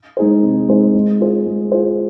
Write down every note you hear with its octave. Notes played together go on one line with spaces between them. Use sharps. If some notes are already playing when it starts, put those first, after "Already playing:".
G#3 D#4 G#4 C5
C3
G#3 D#4 G#4 C5
G#3
F4 G#4 C5
G#3
F4 G#4 C5